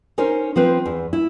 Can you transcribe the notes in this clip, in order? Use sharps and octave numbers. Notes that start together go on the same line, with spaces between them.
C#4 D#4 A#4 C5
F3 C4 B4
E2
E4